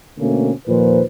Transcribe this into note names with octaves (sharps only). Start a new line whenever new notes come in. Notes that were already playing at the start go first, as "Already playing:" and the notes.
B2 D3 A3 A#3 C4 C#4
D#2 A#2 F3 B4 C5